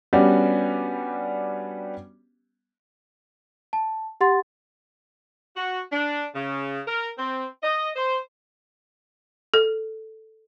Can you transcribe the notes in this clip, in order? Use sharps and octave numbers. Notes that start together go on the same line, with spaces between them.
G3 B3 C#4 D4 F#4 G4
A5
G4 F#5 C6 A6
F#4
D4
C#3
A#4
C4
D#5
C5
A4